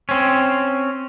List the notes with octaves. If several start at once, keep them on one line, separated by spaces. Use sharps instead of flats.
C4 C#4